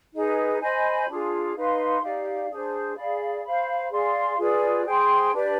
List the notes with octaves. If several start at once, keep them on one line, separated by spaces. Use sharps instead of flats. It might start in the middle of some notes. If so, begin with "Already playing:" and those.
D#4 G#4 B4
C5 D#5 G#5 B5
D4 F4 G#4
D#4 B4 F5 C6
D#4 G4 D5 F5
D4 G#4 C5
G#4 D5 F5 B5
C5 F5 B5
G#4 D5 F5 C6
F4 G#4 B4 D5
G#4 C5 G5 C6
D4 G4 B4 D5